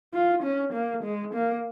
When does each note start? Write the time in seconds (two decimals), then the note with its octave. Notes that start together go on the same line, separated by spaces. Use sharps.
0.14 F4
0.43 C#4
0.73 A#3
1.03 G#3
1.34 A#3